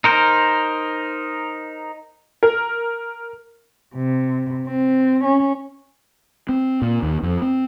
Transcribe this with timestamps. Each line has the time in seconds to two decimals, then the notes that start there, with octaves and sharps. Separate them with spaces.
0.04 D#4 A#4 C5
2.43 A#4
3.95 C3
4.67 C4
5.24 C#4
6.49 C4
6.82 A#2
7.02 D#2
7.22 F2
7.42 C4